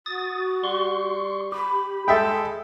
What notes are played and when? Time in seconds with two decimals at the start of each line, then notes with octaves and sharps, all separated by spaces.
0.06 F#4 D#6 A6
0.64 G3 C6 C#6
1.52 G4 B5
2.08 G#3 G#4 A4 E5 G5